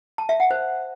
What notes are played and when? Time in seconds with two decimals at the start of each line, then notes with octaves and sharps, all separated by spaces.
0.18 A5
0.29 E5
0.40 F#5
0.51 C5